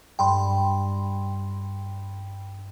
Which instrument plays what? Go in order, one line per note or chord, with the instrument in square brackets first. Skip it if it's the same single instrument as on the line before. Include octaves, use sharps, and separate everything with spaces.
[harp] G2 [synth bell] G5 B5 C6